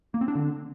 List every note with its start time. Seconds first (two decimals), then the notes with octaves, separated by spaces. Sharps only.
0.14 A#3
0.21 C4
0.28 D4
0.35 D3